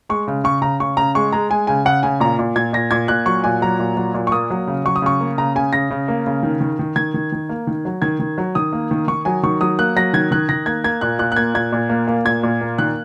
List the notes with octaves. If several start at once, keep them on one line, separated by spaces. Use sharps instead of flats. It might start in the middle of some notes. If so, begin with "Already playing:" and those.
G#3 C#6
C#3
C#3 C#6
C#3 A#5
C#3 C#6
C#3 A#5
G#3 C#6
G#3 A#5
G#3 G#5
C#3 G#5
C#3 F#5
C#3 G#5
A#2 A#5
A#2
A#2 G#6
A#2 A#6
A#2 G#6
A#2 F#6
F#3 C#6
A#2 G#5
F#3 A#5
A#2
F#3
A#2
C#6
A#3 D#6
F#3
C#3
F#3 C#6
D#6
C#3 C#6
A#3
C#3 A#5
C#3 G#5
C#3 A#6
C#3
A#3
C#3
D#3
D#3
D#3
D#3 G#6
D#3
D#3
A#3
D#3
F#3
D#3 G#6
D#3
F#3
D#3 D#6
A#3
D#3
D#3 C#6
F#3 G#5
D#3 C#6
F#3 D#6
A#3 F#6
F#3 A#6
D#3 G#6
D#3 F#6
D#3 A#6
A#3 G#6
A#3 G#6
A#2 F#6
A#2 F#6
F#6
A#3 G#6
A#2 G#6
A#2
A#3
A#3
A#2 G#6
A#2
A#3
D#3 F#6